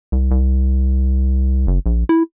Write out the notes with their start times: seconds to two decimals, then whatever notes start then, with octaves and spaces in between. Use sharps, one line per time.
0.12 C2
0.31 C2
1.67 F#1
1.86 A#1
2.09 E4